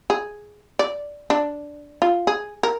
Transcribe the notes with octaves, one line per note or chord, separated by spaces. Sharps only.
G#4
D5
D4
F4
G#4
A#4